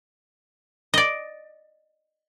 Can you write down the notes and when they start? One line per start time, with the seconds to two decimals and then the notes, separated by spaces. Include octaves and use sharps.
0.94 D5 D#5